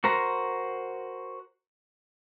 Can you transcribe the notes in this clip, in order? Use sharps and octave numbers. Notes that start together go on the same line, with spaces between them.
F#4 A#4 C5 A#5